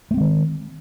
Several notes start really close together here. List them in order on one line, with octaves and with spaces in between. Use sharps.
A3 C4 G#3 D#3